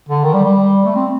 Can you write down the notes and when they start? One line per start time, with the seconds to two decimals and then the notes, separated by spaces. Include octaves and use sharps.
0.09 D3
0.24 D#3
0.34 G3
0.45 G3
0.85 A3
0.96 C4